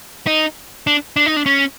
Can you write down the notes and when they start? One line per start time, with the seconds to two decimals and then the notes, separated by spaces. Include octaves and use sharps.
0.27 D#4
0.87 D4
1.16 D4
1.26 D#4
1.37 D4
1.46 C#4